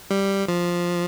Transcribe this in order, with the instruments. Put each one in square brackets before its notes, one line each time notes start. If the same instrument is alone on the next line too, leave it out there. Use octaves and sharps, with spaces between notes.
[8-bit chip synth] G3
F3